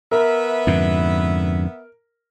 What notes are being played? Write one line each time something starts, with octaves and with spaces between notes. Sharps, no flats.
B3 A#4 B4 E5
F2 G#2 D3